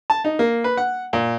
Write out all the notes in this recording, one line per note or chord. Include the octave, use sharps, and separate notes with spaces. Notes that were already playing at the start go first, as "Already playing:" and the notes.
A5
D#4
A#3
B4
F#5
A#2